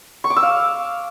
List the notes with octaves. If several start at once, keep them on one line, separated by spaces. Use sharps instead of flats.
C#6
D6
E6
F5